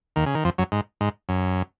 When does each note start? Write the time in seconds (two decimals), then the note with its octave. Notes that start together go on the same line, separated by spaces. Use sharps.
0.16 D#2 D#3
0.26 C#3
0.35 D#3
0.45 F2 F3
0.58 F#2 F#3
0.72 G#2
1.01 G#2
1.29 F#2